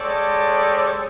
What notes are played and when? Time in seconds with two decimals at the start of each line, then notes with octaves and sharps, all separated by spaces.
0.01 G#3 G4 A4 C#5 D5